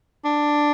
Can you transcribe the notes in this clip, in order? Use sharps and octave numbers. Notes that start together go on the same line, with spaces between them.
D4